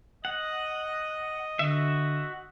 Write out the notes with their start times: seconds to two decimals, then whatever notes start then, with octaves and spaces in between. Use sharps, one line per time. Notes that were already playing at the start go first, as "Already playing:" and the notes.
0.25 D#5 F#5
1.59 D3 F#4 E5